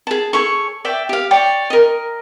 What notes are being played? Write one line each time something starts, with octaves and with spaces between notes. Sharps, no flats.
G#4 A5
G#4 A4 C#5 C#6
D5 E5 G5
G4 F5
C#5 D5 G5
A#4 D#5